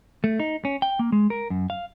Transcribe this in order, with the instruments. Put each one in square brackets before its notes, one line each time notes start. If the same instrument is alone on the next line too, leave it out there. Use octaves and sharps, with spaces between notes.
[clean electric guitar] A3
D#4
C#4
G5
A#3
G#3
A#4
F#2
F5